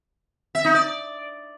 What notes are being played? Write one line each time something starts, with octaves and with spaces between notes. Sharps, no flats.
E5
D#4
D5